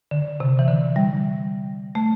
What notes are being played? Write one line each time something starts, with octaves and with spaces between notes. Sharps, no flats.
D3
C3
E3
D3
G3
A3